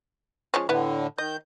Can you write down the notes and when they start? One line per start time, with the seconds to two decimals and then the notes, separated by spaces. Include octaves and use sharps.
0.54 F3 G#3 C#4
0.69 A2 D3 B3 E4
1.18 D#3 D#5 G6